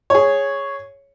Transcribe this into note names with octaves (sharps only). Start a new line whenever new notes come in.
G#4 C#5